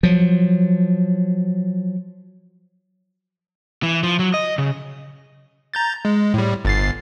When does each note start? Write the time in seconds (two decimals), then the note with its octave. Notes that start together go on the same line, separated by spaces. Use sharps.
0.03 F3 F#3
3.83 E3
4.03 F3
4.19 F#3
4.34 D#5
4.58 C#3
5.74 A#5 G6 A6
6.05 G#3
6.34 A2 G3
6.65 G1 A6 C7